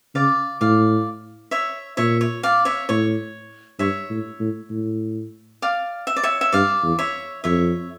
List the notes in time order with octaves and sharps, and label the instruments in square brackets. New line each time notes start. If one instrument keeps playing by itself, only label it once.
[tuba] C#3 [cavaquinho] D5 F5
[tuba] A2 [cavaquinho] D5 F5
[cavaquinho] C#5 E5
[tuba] A#2 [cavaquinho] C#5 E5
[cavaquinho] C#5
D5 F5
C#5 E5
[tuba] A2 [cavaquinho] C#5
[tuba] G2 [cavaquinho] C#5 E5
[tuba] A2
A2
A2
[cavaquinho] D5 F5
E5
D5
C#5 E5
E5
[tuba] G2 [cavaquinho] D5 F5
[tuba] E2
[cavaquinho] C#5 E5
[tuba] F2 [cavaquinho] C#5 E5